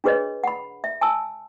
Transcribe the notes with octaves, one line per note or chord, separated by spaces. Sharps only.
D4 F#4 G#4 B4 C#5 D#5
F#5 B5
E5
G#5 A5 E6